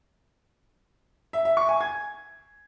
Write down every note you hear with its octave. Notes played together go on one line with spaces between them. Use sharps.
E5
E5
C#6
G#5
G#6